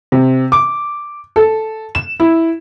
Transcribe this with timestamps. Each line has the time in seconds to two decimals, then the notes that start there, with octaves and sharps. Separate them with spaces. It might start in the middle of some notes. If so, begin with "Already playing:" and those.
0.12 C3
0.52 D6
1.36 A4
1.95 E7
2.20 E4